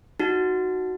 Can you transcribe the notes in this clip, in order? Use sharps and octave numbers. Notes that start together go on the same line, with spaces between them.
D#4 F#4